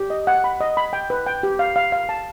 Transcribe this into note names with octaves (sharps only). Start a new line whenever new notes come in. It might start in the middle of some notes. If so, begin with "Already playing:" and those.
Already playing: G4
D#5
F#5
B5
D#5
B5
G5
B4
G5
G4
F5
F5
F5
A5